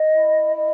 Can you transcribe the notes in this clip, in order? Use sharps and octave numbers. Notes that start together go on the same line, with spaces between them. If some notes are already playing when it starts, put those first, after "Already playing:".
Already playing: D#5
E4
D#5